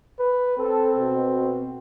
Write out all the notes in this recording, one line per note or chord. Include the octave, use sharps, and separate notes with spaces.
B4
C4 A4
B2